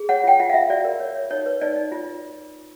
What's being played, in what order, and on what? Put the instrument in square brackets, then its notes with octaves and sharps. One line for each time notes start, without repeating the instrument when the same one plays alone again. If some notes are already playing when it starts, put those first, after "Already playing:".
Already playing: [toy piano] G#4
C#5 F#5
F4 G5
F4 F#5
F5
F4 E5
F#4 D5
A#4
C#5
C#5
D#4 C#5
B4
D#4 D5
D#4
F4